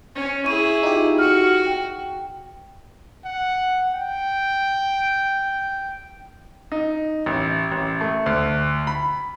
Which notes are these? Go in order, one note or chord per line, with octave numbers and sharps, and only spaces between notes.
C#4
E4 G#4 C#6 D#7
D#4 F4 G4
F#4 F6
G5
F#5
G5
D#4
A1
A1
A3
D2
B5